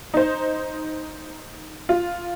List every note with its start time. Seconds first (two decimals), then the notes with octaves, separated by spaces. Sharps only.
0.14 D#4 C5
1.89 F4